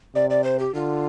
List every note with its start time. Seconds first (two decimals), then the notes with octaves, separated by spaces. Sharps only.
0.15 C3 D5
0.30 D5
0.44 C5
0.59 G4
0.74 D3 F4